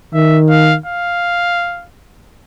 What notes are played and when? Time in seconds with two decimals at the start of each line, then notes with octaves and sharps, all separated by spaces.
0.14 D#3 E5
0.50 F5
0.86 F5